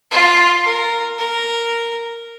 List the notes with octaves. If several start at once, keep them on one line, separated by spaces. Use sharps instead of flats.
F4
A#4
A#4